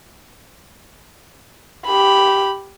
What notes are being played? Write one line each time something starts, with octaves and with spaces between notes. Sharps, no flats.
G4 B5